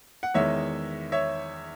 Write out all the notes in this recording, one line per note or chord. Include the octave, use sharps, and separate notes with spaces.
F#5
E2 D#3 G#3 C#5 E5
C#5 E5